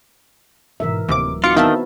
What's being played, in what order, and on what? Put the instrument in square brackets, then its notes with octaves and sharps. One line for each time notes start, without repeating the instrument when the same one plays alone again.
[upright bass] G#2 B2 [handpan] E3 A#4 E5
[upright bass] D1 F#3 [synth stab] D#2 C3 D6
[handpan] C4 D#4 F#4 [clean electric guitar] F4 [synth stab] D6 C#7
[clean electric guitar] D#3 [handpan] B3 C4 E4 [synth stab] E5 F5 A5